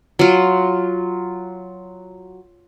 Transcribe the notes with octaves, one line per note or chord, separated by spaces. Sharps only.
F#3 F4